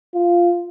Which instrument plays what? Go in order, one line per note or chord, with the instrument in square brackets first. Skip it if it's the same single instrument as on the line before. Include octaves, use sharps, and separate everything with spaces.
[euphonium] F4